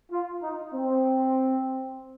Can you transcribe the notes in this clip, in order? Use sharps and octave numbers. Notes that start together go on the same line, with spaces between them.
F4
D#4
C4